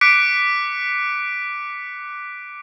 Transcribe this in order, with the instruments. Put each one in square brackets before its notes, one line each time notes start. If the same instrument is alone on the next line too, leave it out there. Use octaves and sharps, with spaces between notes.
[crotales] D6 F#6 B6 C#7 D7